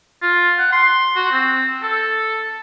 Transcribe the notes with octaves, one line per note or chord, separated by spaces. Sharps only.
F4
F#5
C6
F#4
C4
A4